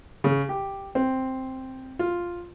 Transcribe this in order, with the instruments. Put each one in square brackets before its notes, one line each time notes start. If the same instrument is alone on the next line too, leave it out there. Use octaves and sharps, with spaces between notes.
[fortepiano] C#3
G4
C4
F4